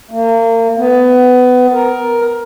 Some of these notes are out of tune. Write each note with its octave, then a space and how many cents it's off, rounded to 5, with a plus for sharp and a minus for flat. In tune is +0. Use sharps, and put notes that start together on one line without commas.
A#3 -35
B3 +20
A#4 +10